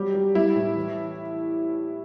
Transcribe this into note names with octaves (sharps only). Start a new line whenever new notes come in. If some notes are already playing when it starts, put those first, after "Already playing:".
Already playing: F#3 G3 G4
G3
G3 E4
A2
E3